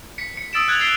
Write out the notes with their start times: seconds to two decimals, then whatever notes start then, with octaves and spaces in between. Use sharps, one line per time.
0.18 B6 C#7
0.37 C#7
0.53 D#6 E6 A6 D7 E7
0.68 F#6 G#6 A6 D7 F7 F#7
0.80 A6 B6 C7 D7 F7 G7